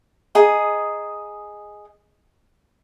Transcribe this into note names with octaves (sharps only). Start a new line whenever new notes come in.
G#4 D#5 A#5